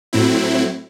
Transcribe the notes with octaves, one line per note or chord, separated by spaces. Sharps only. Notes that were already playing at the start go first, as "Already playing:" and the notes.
A2 F#3 C4 E4